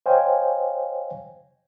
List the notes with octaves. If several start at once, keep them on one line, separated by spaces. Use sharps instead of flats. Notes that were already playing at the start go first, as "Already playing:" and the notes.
C5 C#5 D#5 F5 G5 G#5